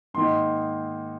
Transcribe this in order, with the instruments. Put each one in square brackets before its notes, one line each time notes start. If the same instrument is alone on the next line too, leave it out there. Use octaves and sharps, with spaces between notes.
[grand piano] G#2 D#3 A#3 D#4 C6